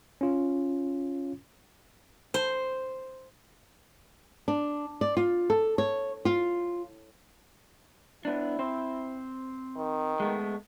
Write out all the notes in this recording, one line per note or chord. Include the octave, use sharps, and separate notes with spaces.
C#4 F4
C5
D4
D5
F4
A4
C#5
F4
B3 D4 E4
C4 C5
D#3
G#3 A3 B3